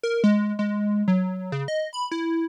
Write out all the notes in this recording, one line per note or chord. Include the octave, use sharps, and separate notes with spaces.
A#4
G#3
G#3
F#3
C#3
D#5
B5
E4